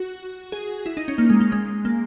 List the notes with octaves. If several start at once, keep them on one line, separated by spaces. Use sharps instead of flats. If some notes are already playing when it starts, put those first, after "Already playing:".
Already playing: F#4
G#4
E4
D#4
C#4
A#3
G#3
A#3
G#3
A#3